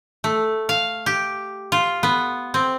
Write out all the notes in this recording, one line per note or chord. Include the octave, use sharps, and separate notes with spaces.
A3
F5
G4
F4
B3
C4